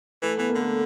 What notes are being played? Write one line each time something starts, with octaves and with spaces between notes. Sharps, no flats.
E3 A3
E3 B3
A#3
D3
A3